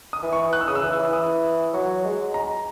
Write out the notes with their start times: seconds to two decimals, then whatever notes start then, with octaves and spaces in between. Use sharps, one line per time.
0.13 D#6
0.22 E3
0.33 C#6
0.53 F#6
0.61 E6
0.68 C#3 D#6
0.75 E6
0.83 E3
0.99 E3
1.13 D#6
1.73 F#3 C#6
2.05 G#3
2.34 A#5